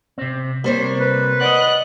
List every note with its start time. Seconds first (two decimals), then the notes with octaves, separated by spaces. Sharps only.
0.18 C3 C4
0.64 C3 G3 A#3 C5 C#5
0.99 B4
1.41 D5 D#5 F#5 F#6